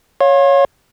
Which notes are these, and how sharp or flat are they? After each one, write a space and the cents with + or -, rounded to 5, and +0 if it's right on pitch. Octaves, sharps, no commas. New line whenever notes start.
C#5 +0 F5 +20 C6 +45